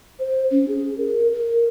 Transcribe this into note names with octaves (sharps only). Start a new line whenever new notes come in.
C5
C#4
G#4
A#4
A#4